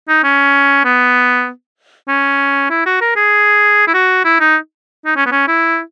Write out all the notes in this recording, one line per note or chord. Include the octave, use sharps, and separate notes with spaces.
D#4
C#4
B3
C#4
E4
F#4
A#4
G#4
E4
F#4
E4
D#4
D#4
C#4
B3
C#4
E4